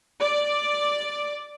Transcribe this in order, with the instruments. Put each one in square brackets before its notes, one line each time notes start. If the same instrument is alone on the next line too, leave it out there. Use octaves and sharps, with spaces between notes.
[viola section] D5